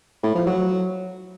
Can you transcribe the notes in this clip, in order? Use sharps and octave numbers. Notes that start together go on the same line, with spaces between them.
A2
F3
F#3